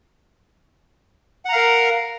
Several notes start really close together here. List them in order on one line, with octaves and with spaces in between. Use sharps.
F#5 A#5 F5 A#4